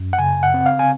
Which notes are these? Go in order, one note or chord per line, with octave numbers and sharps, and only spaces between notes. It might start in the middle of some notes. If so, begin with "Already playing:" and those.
Already playing: F#2
F#5
C#3 G#5
F#5
C4
F5
G#5